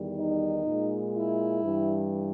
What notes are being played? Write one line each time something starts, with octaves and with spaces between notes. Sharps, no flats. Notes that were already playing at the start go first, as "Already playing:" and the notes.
Already playing: E2 D#3 G3
D#4
A#2 G#3
E4
G2 E3 G3